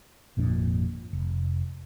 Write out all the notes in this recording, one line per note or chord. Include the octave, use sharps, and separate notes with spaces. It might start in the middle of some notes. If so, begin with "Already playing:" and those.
G#1 F2 A#2 D4
F1